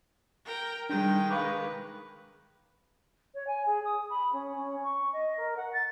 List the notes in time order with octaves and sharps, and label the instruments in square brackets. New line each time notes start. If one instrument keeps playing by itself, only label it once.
[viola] A#4 G5
[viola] D#3 G#3 [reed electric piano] G3 D4 [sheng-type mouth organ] G5
[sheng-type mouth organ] B4 [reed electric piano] F5 C#6 D6
[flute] C#5
G#5
G#4
D#6
B5
C#4
C#4
C#6
D#5
A#4
F#5
A6